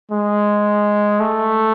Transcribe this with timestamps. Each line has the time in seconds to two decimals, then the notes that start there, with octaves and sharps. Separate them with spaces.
0.11 G#3
1.20 A3